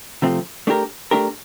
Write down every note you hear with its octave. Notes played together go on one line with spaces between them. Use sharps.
C3 F3 A3 C4
A3 D4 G4 A#4
A3 D4 G4 A#4